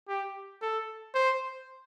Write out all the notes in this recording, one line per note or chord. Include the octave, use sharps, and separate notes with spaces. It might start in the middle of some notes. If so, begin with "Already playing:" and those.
G4
A4
C5